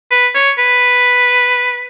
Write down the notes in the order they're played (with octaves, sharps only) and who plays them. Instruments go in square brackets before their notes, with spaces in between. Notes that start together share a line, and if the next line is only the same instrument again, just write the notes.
[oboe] B4
C#5
B4